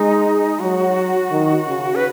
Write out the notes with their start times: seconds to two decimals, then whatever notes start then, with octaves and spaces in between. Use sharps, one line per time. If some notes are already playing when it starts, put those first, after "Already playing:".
Already playing: G#3 D#4
0.60 F#3 F#4
1.31 D#3
1.67 C#3
1.95 B4